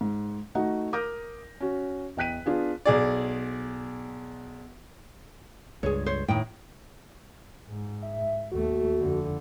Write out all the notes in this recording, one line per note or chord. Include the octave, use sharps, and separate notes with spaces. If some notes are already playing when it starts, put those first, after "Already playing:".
G#2
A3 D#4 F#4 D#5 F#5
A#4 D6 D#6 F6 G6 A#6
C#4 F#4
E2 D#5 G5 F#6 B6 D#7
B3 D4 F4 G#4
B1 G#4 D5
C#2 G2 G#4 C#5
C5 C#5
D#2 A2 D#4 G5
G#2
E5
D#2 A3 F#4
F2 D3